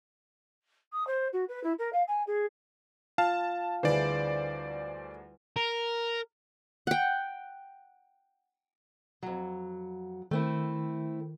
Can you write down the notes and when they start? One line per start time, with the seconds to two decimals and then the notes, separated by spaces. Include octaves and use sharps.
0.92 D#6
1.07 C5
1.32 F#4
1.48 B4
1.63 E4
1.78 A#4
1.92 F5
2.07 G#5
2.26 G#4
3.18 F4 F5 A5
3.83 D2 D3 G3 E4 G#4 B4 C5 D5
5.56 A#4
6.87 F#5 G5
9.22 F2 F#3
10.31 D#3 A3 C4 E4